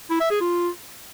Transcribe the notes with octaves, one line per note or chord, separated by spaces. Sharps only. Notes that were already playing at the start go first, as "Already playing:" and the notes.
E4
E5
G#4
F4